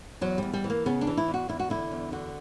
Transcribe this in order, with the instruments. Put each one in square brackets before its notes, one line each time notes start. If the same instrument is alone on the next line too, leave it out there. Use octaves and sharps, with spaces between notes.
[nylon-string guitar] E2 F#3
E2 G3
G3
E3
A#3
C#3 B3
D4
E3
E4
E2
F#4
E2 E4
F#4
D3 E4
E2
D3 F#4